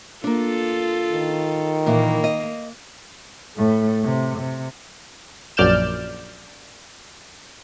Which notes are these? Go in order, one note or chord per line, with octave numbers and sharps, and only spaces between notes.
A#3 D4 F4 A4
D#3
A#2 E3 A#3
D#5
A2 A3
C3
C3
A#1 F#2 D5 F6 G6 E7